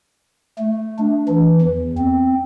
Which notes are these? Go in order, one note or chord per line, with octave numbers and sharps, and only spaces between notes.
A3
D4
E3
E2
C4